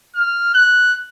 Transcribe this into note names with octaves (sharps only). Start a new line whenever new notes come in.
F6
F#6